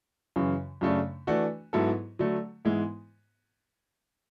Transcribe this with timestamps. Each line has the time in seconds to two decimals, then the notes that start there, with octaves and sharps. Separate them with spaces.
0.36 F#2 C#3 E3
0.81 F#2 C#3 F#3 A3 D4
1.27 E3 A3 D4 F#4
1.73 G#2 F#3 B3 E4 A4
2.19 D3 F#3 A3
2.65 G#2 E3 G#3 B3 E4